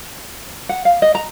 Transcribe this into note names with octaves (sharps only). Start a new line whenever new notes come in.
F#5
F5
D#5
A#5